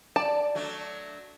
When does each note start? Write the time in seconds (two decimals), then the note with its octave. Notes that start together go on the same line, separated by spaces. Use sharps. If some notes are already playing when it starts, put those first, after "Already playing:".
0.16 D5 A5
0.55 F#3 A3 D4